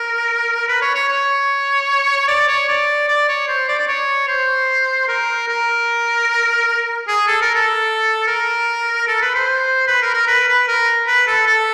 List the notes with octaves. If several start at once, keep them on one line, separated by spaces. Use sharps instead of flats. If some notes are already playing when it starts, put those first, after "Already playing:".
Already playing: A#4
B4
C#5
C#5
C#5
D5
C#5
D5
D5
C#5
C5
D5
D5
C#5
C5
A#4
A#4
G#4
A4
A#4
A4
A#4
A4
B4
C5
B4
A#4
A#4
B4
B4
A#4
B4
A4
A4